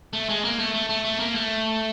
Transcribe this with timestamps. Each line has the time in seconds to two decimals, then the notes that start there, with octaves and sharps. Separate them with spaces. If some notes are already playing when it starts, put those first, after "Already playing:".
0.13 A3
0.29 G#3
0.44 A#3
0.59 A3
0.74 A3
0.89 A3
1.05 A3
1.19 A#3
1.35 A3